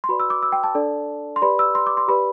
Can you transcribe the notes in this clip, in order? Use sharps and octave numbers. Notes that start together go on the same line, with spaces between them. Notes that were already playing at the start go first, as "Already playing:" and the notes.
C6
F#4 B4 D5 B5
E6
D6
E6
G5
A5
D4 A4 D5
C6
G4 B4 D5 B5
E6
C6
D6
C6
G4 B4 D5 B5